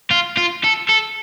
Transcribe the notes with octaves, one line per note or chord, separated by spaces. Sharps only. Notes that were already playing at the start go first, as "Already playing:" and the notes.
F4
F4
A4
A4